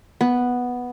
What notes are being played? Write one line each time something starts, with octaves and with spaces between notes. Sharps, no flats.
B3